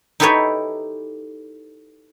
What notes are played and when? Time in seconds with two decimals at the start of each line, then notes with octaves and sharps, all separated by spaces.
0.20 D#4 E4 G4 A4 B4 C#5